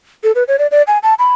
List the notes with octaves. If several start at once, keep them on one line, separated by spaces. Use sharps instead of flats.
A4
B4
C#5
D5
D5
G#5
A5
B5